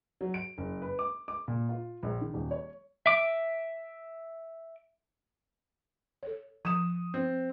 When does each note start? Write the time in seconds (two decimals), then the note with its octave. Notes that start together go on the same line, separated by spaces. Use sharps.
0.21 F#3
0.34 D7
0.58 F#1
0.82 B4
0.99 D6
1.28 D6
1.48 A#2
1.69 F4
2.03 A#1
2.21 D#3
2.34 D#1
2.51 C#5
3.06 E5 D6
6.23 A4 C#5
6.65 F3 D#6 E7
7.14 C4